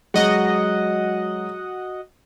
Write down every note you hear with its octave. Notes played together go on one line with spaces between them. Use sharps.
F#3 G#3 F#4 D#5 F#5